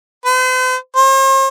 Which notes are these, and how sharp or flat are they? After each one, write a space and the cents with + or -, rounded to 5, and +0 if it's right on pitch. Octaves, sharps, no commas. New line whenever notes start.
C5 -45
C5 +45